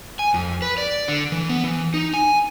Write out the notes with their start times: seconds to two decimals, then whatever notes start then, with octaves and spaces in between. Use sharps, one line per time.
0.19 G#5
0.34 F2
0.62 B4
0.78 D5
1.08 D3
1.32 E3
1.49 B3
1.64 E3
1.94 D#4
2.14 G#5